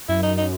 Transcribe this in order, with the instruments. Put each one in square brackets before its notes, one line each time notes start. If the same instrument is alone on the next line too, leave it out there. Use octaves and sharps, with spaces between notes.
[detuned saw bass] F#2 [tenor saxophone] E4
[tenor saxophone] D#4
D#4